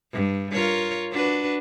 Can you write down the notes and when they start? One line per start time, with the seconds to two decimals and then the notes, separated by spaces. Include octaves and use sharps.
0.13 G2
0.52 F4 A#4 C#5
1.12 D4 F#4 B4